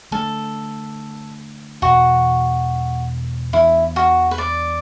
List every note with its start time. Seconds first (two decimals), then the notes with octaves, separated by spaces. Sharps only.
0.11 D3 A3 D4 A4
1.82 E2 B2 B3 F#4
3.53 E2 E3 B3 D4 E4
3.96 F#4
4.31 B4
4.38 D5